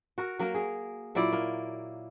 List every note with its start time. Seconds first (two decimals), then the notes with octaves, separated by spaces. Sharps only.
0.18 F#4 A#4
0.39 F#3 A#3 A#4
0.55 G#4
1.15 A#2 F#3 E4 D5
1.32 A#3